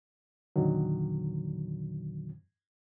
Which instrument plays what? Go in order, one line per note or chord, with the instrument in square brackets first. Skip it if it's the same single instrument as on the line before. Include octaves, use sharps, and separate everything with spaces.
[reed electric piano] E2 A#2 D3 D#3 F#3